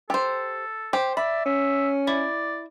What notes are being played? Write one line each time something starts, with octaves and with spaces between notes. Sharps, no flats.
G4 A4 C5
G4 C5
D5 E5 B5
C#4 E5
E4 D5